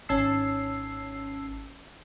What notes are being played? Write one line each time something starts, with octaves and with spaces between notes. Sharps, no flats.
G#1 C#4 A5 E6 C7